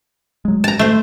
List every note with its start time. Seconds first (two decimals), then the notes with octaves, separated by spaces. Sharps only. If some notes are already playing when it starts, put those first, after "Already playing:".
0.45 F#3 G#3
0.64 A5 A#5
0.79 A3 C5